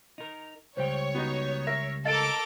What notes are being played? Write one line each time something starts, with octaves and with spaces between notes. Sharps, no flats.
D#4 A#4
C#2 G3 C5 C#5 G5
B3 D#4 F#4
A#4 E5 A#6
A4 A#4 D#5 F5 D6 A6 D7